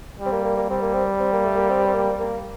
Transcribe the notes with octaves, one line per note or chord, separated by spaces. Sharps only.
G3
C4
A#3
A#3
A#3
G3 C4
A#3
C4
C4
A#3
A3
A#3
C4
C4
A#3
A#3